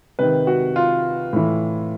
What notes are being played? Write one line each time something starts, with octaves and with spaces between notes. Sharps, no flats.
C3 D#3 B4
F#4
F4
A2 E3